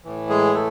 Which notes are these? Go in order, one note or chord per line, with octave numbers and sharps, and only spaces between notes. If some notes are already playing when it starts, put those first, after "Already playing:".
A2 E3
G#3 G#4
A3 A4